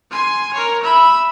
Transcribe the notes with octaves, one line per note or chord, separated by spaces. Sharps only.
G#5 C6
A#4 C#5
E5 B5